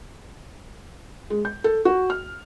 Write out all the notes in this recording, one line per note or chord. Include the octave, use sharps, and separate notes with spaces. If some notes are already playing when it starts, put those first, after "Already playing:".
G#3
G6
A4
F#4
F6